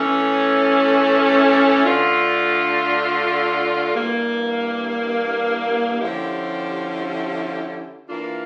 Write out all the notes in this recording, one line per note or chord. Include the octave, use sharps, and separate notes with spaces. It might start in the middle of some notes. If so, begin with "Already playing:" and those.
Already playing: E3 A3 C#4
D3 A3 D4 F4
G2 E3 A#3
D3 F3 C#4 E4 G4
E3 A#3 D4 F4